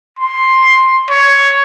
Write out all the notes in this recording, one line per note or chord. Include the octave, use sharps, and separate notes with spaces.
C6
C#5